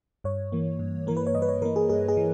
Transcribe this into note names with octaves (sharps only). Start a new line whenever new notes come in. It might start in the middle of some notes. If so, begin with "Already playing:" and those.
G2 C#5
E3 A#3
G2
E3 A#3 A#4
B4
C#5
G2 D#5
B4
C#5
E3 A#3 A#4
G#4
G2 G#4
G#4
E3